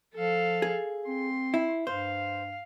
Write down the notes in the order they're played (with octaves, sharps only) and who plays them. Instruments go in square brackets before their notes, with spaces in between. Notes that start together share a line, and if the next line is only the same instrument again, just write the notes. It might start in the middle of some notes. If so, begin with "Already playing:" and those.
[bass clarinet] F3 [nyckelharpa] A4 F5
[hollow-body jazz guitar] G#4
[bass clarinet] C4 [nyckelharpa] C6
[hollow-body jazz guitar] E4
[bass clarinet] G2 [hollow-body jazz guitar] C5 [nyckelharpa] F5